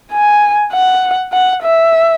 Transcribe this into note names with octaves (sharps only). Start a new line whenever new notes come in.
G#5
F#5
F#5
E5